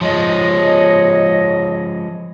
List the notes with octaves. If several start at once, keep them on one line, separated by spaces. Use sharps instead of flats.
F3 G#3 C#5 D#5